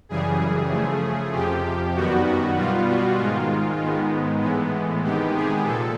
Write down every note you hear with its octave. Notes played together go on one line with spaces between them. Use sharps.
F#2 C#3 E3 G3 G#4
C#3 F3 A3
F2 C3 F3 G4
F#2 D#3 G3 B3 F#4
F#4
B2 G3 B3 F4
F#4
G#2 D#3 G#3 F4
G#2 D#3 G#3 B3
A2 E3 G#3 B3
C3 D#3 G#3 B3 G4
G#4
A#2 F3 A4